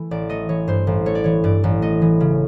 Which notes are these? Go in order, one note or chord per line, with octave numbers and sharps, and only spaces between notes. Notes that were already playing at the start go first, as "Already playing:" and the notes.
Already playing: E3 A3
A1 D5
A3 D#5
E3 C#5
G2 C5
A1
A3 C#5
D5
E3 C#5
G2 D5
A1
A3 D#5
E3
C#3